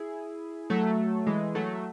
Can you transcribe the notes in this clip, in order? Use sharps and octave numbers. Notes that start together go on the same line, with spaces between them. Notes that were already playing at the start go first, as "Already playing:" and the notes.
Already playing: E4 G#4
F#3 A3
E3 G#3
F#3 A3